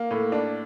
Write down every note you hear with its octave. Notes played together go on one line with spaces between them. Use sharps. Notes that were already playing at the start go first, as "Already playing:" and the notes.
Already playing: A#3
A2
D4